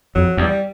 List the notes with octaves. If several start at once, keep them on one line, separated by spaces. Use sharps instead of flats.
F2 F#3
E2 G3